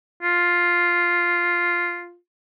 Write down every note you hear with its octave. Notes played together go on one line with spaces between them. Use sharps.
F4